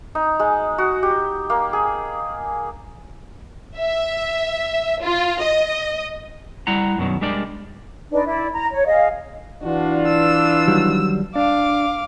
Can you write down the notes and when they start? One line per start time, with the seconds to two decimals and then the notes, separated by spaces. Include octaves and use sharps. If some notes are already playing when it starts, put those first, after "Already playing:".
0.15 D#4
0.40 G#3
0.78 F#4
1.03 G4
1.50 A#3
1.73 G#4
3.77 E5
5.02 F4
5.41 D#5
6.67 G3 E4 F#5 A#5
6.98 F#2 B2 D#3 F#3
7.21 G3 G#3 D4 A#4 D5
8.12 D4 D#4 B4 D5
8.26 E4 D5
8.52 A#5
8.72 C#5
8.85 G#4 D#5 F5
9.63 E3 D4 F4 F#4
10.08 E6
10.68 D#3 F#3 G3
11.36 D4 F5 D6